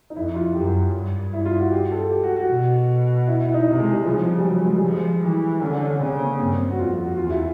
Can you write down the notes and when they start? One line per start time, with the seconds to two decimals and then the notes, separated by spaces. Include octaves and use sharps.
0.10 D#4
0.16 F2 E4
0.35 F4
0.55 F#2 G4
0.93 G2
1.33 E4
1.45 F4
1.59 F#4
1.71 G4
1.91 A4
2.10 G4
2.23 F#4
2.36 F#4
2.50 B2
3.27 E4
3.40 E4
3.54 D#4
3.67 C3
3.80 G#3
3.93 G3
4.05 C#3 F3
4.39 G3
4.45 F#3
4.64 G#3
4.78 G3
4.84 F3
4.91 G#3
5.23 E3
5.61 D3 C#4
5.75 D4
5.87 C#4
6.01 C#3 C4
6.20 A#3
6.39 G2 C4
6.59 C4
6.70 F#4
6.79 F2 F4
6.92 F#4
7.04 F#4
7.17 E2 F4
7.30 E4